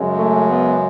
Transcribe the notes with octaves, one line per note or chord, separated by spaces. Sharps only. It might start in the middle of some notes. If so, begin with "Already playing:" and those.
Already playing: F#2 C#3 G#3
A3
B3